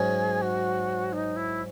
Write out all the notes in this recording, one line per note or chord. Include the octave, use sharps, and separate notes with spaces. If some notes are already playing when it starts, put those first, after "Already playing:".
Already playing: G#2 F#3 C#4 G#4
F#4
D#4
E4